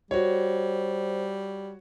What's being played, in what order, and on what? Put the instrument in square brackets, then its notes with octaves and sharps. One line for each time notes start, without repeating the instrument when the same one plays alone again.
[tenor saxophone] G3 [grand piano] F#4 C#5 [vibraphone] C5